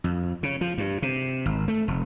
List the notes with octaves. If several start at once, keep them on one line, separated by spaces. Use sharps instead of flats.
F2
C#3
F3
G2
C3
G#1
A3
F1